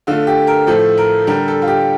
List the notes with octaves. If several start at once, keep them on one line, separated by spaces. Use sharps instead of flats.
D3 A3 F4
G4
A#4
A2 F3 A3 A4
A#4
D3 G3 A#4
A4
F4
G4